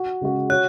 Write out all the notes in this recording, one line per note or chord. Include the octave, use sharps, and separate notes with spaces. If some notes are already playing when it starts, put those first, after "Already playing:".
Already playing: F#4
C#3 G#3 F#4
F#4 C#5 F#6